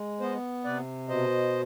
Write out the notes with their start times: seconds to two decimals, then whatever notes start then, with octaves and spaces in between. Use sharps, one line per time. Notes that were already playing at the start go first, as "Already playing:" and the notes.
Already playing: G#3
0.20 B3 C5 D#5
0.64 C3 B4 D5
1.08 B2 C5 D#5